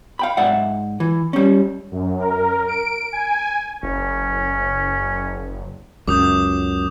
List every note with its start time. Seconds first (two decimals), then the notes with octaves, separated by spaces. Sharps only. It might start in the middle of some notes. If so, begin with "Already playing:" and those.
0.19 F5 G5 B5
0.37 G#2 D5 E5 F#5
1.00 E3
1.33 G3 C#4
1.91 F#2
2.20 A#4
2.68 D7
3.12 G#5
3.83 F#1 C#4
6.08 C#2 F#2 D6 D#6 G6